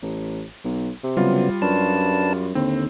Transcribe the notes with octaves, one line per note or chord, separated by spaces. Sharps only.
A1
B1
C3
C#3 F#3 G3 B3 F4
F#2 D4 B4 A5
D#2 D3 C4